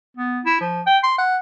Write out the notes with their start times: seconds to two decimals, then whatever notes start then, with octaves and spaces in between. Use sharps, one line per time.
0.17 B3
0.45 E4
0.61 F3
0.87 G5
1.03 C6
1.18 F#5